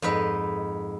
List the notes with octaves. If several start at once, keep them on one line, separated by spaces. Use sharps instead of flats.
F2 G#2 B4 D#5